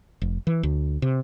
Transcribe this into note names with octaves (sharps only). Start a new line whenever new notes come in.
F1
E3
D2
C3